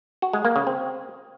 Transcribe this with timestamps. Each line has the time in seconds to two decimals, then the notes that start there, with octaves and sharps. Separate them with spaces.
0.22 F#4
0.33 G#3
0.45 A#3
0.56 C#3
0.67 C4